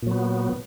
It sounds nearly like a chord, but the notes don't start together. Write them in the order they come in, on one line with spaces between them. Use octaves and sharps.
A#2 F#3 B3